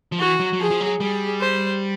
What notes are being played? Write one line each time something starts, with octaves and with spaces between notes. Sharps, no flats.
F3
E3 F#4
F#3
F#3
F3 G#4
F3
F#3
G3 G#4
C5